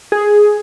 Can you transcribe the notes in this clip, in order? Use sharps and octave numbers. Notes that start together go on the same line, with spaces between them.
G#4